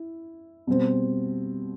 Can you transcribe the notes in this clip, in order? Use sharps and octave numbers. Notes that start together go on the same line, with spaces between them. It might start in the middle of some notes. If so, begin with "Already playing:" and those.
Already playing: E4
B2 G3 C4